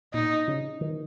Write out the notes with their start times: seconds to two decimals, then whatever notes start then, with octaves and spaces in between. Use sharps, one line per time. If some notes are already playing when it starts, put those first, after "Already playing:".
0.14 A#2 D#4
0.48 C#3
0.81 D#3